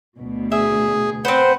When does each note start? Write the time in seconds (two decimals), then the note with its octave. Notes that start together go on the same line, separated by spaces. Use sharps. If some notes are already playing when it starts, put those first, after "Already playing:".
0.17 D2 B2
0.52 G#4 E5
1.25 C4 B4 C5 F#5